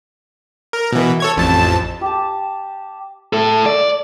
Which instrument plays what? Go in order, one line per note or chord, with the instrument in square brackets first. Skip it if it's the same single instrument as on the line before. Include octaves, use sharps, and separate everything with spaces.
[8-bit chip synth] A#4
B2 E3
A4 C#5 G#6
A1 F2 A5
[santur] G4 A5
[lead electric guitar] A2 A4
D5